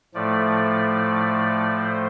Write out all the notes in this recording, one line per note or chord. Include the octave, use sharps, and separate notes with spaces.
A2 F3 A3 D5
C5